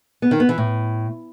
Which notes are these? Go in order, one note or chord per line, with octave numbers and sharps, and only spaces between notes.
B3
D#3
B3
E3
A2